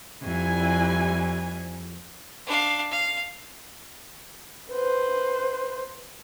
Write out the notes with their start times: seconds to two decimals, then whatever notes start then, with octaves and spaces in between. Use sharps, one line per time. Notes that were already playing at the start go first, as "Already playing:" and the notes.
0.23 F2 G3 E4 G#5
2.46 D4 F5
2.91 F5
4.71 B4 C5